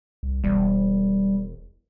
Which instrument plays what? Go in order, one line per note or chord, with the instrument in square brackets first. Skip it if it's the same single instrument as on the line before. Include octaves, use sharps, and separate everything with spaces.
[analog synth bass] C2
[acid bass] E1 [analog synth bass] G3